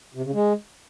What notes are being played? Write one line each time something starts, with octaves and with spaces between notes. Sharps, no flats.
C3
C#3
G#3